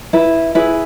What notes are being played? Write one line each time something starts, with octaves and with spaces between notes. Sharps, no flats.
E4 B4
E4 G#4 B4